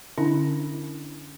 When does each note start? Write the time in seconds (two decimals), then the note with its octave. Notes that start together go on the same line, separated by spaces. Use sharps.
0.18 D3 C#4 D4 E4